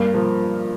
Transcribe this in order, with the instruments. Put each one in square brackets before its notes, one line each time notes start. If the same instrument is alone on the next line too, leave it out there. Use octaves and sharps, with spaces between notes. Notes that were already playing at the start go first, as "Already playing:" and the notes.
Already playing: [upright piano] G2 [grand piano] A#3
[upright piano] F3 [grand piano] A#4